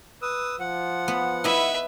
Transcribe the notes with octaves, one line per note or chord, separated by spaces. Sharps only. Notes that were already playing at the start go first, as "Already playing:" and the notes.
B4 D#6 E6
F3 F#5
B3
E4 B4 D#5 E5